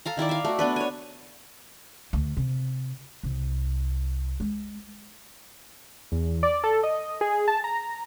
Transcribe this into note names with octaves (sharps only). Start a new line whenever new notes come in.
A4 F5 A#5
D#3 E4 A#4 D5
E5 F5
A3 F#4
B3 D4 B4
C#5 G#5
D2
C3
C2
G#3
E2
D5
A4
D#5
G#4
A5
A#5